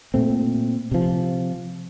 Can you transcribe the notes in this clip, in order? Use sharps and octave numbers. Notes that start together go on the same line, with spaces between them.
A#2 A3 C4
C3 F3